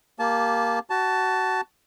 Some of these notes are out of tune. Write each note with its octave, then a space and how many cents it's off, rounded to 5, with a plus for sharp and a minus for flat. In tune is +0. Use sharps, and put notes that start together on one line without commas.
A#3 +0 G4 +0 A5 -25
F#4 +20 A5 +0